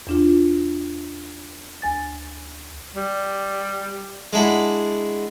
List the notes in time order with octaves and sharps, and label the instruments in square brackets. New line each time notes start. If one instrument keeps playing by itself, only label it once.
[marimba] E2 D4 F4
D2 G#5 A6
[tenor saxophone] G3
[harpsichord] G#3 D4 E4 F#4